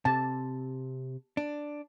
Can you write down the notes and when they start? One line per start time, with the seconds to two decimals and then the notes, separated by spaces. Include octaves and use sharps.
0.05 C3 A5
1.37 D4